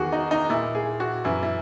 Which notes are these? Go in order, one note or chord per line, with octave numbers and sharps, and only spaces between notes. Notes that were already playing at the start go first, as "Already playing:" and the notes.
Already playing: E2 D#3 F#4 G#4
D#4
D#4
A#2 E4
G#4
F#4
F#2 E3 E4
E4